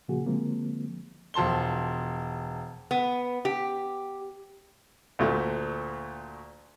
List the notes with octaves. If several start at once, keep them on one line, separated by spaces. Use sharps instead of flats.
A#2 C#3 F3 A#3 F#4 G#4
D3 F3 G#3 A#3 C4
E1 F3 A5 C6 G7
B3
G4
D2 A#2 A3